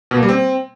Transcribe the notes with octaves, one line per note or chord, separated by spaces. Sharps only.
B2
A#3
G3
C4